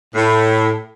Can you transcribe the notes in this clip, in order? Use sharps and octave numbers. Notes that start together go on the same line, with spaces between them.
A2